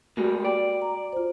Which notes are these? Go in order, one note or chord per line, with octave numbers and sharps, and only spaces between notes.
G3 G#3 A#3 F#4
D5 G5
A#5
F4 C5